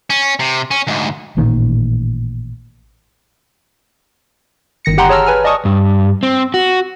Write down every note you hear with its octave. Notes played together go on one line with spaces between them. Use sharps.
C#4
C3
C#4
D2 G#2
A1 A#2 D#3
G1 D#3 A#6 C#7
G4 F#5 G5 A#5 C6
G#4 C#5 A5 A#5 E6 F6
B4 G#5 F6
D5 D#5 G#5 A5 C#6 D#6
G2
C4
F#4